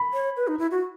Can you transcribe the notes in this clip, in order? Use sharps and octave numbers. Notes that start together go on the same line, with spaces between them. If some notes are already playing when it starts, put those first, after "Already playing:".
Already playing: B5
C#5
B4
D#4
E4
F#4